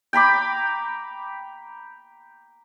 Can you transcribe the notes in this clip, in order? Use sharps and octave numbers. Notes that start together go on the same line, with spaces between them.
G5 A#5 B5 D6